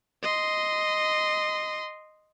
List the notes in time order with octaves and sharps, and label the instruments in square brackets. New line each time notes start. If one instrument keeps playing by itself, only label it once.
[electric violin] D#5 C6